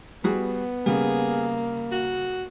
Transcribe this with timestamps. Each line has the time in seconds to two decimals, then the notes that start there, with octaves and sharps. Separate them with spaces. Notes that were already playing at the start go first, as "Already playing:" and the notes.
0.24 G3 B3 F#4 G#4
0.86 C#3 G3 A#3 G#4
1.91 F#4